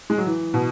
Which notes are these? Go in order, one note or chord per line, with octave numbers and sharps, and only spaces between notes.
G#3
F#3
E3
B2